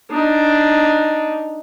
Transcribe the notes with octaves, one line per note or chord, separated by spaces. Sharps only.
D4 D#4